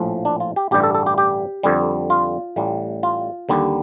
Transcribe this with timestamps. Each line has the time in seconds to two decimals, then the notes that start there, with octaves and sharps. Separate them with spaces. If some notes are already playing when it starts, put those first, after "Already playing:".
Already playing: A#1 A2 F3
0.25 D4
0.40 F4
0.56 G4
0.71 A1 G2 D3 G3 G4
0.84 A4
0.95 A4
1.06 G4
1.18 G4
1.63 F2 D3 G3
2.10 F4
2.56 A1 A2 G3
3.03 F4
3.49 D#2 D3 G3